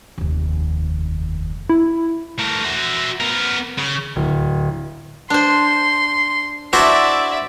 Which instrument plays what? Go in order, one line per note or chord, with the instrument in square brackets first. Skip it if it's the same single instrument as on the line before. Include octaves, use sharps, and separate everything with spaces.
[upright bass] F1 D#2
[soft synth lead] E4
[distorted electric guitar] A3 A#4
F#4 E5
B3 A#4
C#3
[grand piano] D1
[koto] D4 C5 [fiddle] C6
[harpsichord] D4 E4 F#4 [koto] C5 [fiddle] D5 E5